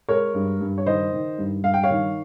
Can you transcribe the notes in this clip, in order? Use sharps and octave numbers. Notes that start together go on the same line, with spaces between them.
G#3 A#4 C#5
G2
G2
C#5
D#3 C5 D#5
D#3
G2
G2 F5
G5
C#5 F5
D#3